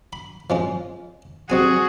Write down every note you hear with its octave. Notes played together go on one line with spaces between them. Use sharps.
B5
F3 G#3 C#4
G3 C4 F#4 G#4 G#5